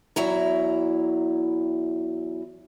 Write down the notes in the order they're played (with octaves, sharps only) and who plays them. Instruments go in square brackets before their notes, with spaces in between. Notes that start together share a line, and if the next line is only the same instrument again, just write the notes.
[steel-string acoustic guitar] E2 F#3 E4 A#5